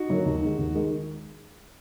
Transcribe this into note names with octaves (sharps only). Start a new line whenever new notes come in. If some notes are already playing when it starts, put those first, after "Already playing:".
Already playing: D#4 F#4
D3 F#3 A#3
D#2
D#3 G#3
D#2
D#3 G#3